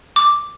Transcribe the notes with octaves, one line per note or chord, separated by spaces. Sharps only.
D6